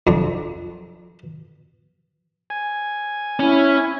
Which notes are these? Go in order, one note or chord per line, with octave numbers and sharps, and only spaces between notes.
F2 D4
G#5
C#4 E4